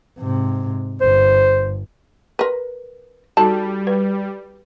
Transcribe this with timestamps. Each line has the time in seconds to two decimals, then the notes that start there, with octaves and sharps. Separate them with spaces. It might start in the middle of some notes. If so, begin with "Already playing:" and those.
0.19 G#2 C3
1.01 G1 C5
2.39 A#4 B4
3.37 G3 D#4 F#4 A4 A5
3.87 B4